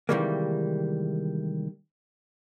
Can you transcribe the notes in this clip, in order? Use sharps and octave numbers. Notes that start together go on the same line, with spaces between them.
C3 D#3 E3 G3 G#3 A#3